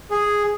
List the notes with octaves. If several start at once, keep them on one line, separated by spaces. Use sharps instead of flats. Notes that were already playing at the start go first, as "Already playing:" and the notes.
G#4